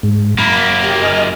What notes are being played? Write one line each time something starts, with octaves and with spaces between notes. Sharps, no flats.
G#2
F#2 A#3 B5
G4
D#5 G#5 F6